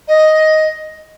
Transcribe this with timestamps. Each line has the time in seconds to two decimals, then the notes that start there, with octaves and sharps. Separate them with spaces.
0.08 D#5